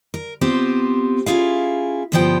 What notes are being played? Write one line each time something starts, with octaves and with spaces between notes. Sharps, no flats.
A#4
B3 C4 F4 G4 C5
C#4 E4 F4 G#4 F5
D2 G2 F3 B3 C5 G5